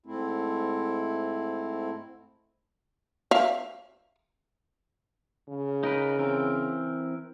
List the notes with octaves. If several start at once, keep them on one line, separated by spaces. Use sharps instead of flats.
G#2 A3 C4 E4
E5 F5
C#3
D#4 A#4 B4
E3 C4 A#4